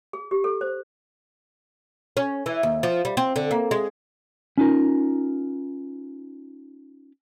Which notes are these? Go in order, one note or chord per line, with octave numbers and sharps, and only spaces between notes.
G#4
G4
A4
C5
C#4
E3
D#2
F3
G3
C4
D3
A#3
G#3
C#4 D#4 F4 A#4